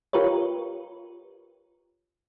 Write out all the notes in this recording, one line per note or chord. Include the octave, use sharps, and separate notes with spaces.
F4 G4 A#4 B4 C#5